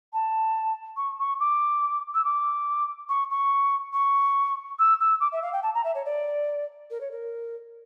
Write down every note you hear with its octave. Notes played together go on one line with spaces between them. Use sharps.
A5
C#6
C#6
D6
E6
D6
C#6
C#6
C#6
E6
E6
D6
E5
F5
G5
A5
A#5
E5
C#5
D5
A#4
C#5
A#4